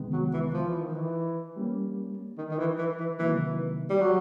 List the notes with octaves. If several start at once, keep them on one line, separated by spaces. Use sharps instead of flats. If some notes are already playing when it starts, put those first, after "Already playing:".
Already playing: C2 C3 D#3 G#3 B3
F#3
E3
F3
E3
D#3
E3
G3 A#3 C#4
D#3
D#3
E3
E3
E3
C3 D#3 E3 F#3 A#3 D#4
G3
F#3